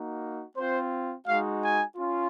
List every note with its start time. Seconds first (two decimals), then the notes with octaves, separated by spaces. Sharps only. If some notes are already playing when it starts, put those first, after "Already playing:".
Already playing: A#3 D#4 F#4
0.57 C4 F4 C5
1.27 G#3 D#4 F#4 F5
1.62 G#5
1.97 C#4 F4